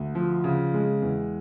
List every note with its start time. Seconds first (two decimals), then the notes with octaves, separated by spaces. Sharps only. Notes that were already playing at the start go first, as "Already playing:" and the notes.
Already playing: D2
0.15 F3
0.44 C#3
0.74 G#3
1.02 E2